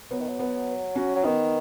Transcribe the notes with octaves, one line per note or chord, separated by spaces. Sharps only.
F#3 B3
D#3
F#3
B3
C#4 F#4
F#3
D#3 B3 D#4